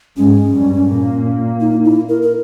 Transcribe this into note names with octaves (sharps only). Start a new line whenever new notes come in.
G#2 G#3 C#4
G2 G3
A#2 A#3
D#4
E4
A#4
A#4